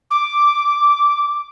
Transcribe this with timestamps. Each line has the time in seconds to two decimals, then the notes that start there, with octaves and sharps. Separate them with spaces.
0.10 D6